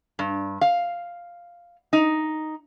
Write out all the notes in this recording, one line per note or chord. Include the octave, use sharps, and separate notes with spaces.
G2
F5
D#4